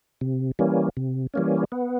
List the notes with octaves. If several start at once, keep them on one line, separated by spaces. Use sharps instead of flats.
C3
E3 G3 A#3 C#4
C3
E3 G3 A#3 C#4
B3